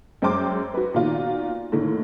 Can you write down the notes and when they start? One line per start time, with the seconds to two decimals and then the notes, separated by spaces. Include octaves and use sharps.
0.22 F#2 G#3 C5 G5 C6 D6
0.74 F#4 B4
0.94 A#2 D#3 B3 F4 F#4
1.72 A2 D3 D#3 A3 A#3